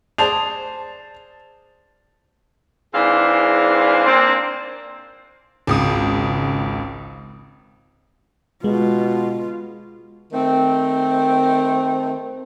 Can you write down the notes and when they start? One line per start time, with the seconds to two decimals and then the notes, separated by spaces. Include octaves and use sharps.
0.18 G#4 C5 D5 A5 F7
2.94 G#2 E3 C4 D4 G#4 F5
4.06 A#3 C4 D4
5.67 G#1 C#2 D#6
8.64 B2 G#3 F4
10.33 D#3 A3 C4